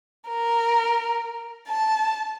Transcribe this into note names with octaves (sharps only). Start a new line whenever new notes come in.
A#4
A5